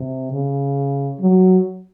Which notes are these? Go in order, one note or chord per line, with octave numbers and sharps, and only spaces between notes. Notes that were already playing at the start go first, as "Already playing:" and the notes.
Already playing: C3
C#3
F#3